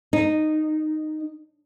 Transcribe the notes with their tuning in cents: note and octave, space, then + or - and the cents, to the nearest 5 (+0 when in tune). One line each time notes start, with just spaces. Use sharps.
D#4 -10